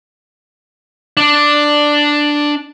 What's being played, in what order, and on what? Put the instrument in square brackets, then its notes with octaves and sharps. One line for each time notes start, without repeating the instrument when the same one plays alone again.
[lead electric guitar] D4 D5